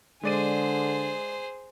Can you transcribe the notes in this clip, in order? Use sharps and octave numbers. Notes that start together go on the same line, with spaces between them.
D3 G#3 G#4 C5 D5 D#7